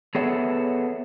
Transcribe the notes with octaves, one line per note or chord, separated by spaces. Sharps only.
B3 G#4 A4 C#5 E5 F#5